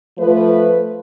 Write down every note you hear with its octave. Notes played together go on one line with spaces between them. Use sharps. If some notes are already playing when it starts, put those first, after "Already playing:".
F3 A3 B4